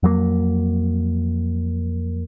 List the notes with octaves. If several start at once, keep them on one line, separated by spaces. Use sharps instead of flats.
F2 F#3 G3 A#3